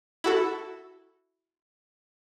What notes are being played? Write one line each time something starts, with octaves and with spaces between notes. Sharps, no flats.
E4 F#4 A4